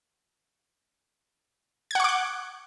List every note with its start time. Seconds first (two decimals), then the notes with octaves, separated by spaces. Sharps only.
1.91 G#6
1.95 F#5
2.00 C#6
2.04 D6
2.09 F#6